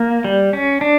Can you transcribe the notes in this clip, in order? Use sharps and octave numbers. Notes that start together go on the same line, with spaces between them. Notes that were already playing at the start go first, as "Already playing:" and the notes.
Already playing: A#3
G3
C#4
D4